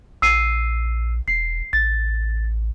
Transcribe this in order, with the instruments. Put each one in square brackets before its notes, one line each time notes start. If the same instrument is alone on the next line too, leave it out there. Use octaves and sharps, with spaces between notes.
[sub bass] A#1 [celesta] E6 C7 D#7
[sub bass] E1 [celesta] C7
[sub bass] A1 [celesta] A6